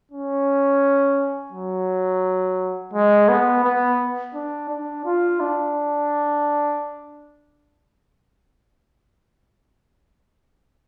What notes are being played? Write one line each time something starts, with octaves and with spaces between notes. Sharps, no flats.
C#4
F#3
G#3
B3
B3
D4
D4
F4
D4